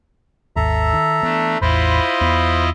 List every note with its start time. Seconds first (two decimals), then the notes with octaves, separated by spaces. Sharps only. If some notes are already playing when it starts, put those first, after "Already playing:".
0.56 G#1 D#2 A4 E5 A#5
0.93 D#3
1.23 E3 A3 B3 D4
1.61 A1 E2 E4 F4 C5 D#5 B5
2.21 E2 B3